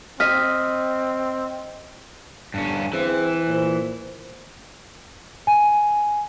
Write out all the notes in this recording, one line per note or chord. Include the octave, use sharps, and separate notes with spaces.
C4 D#5 F6 B6
G1 G2 C#4
E3 C4 G#4 C5
A#2 C5
G#5